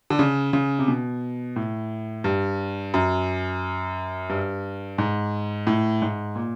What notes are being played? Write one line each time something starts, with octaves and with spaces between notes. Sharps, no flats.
D3
C#3
C#3
C3
B2
A2
G2
F#2
G2
G#2
A2
G#2
A#2